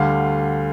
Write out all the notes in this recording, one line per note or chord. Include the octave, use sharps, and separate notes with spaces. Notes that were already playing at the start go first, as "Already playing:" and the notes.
Already playing: D2 D3 G3 F5